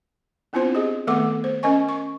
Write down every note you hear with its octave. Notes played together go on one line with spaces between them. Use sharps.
B3 C4 D4 E4 F4 C5
G4 G#4 D#5
D#3 A3 B3 A4 F#5 D6
C5
C#4 A#4 D#5 G#5 C#6
C#6